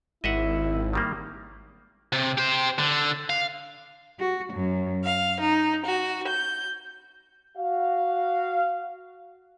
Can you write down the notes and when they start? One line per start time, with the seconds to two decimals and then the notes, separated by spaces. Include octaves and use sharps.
0.24 G#1 E4 D#5 E5 F#5
0.93 D#3 G3 A#3
2.12 C3
2.38 G4 C5
2.79 D3
3.30 F5
4.19 F#4
4.52 F#2
5.04 F5
5.40 D#4
5.86 F#4
6.28 G6
7.57 F#4 F5